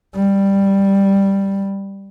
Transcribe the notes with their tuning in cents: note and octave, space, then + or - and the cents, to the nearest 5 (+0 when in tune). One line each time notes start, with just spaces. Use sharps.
G3 +5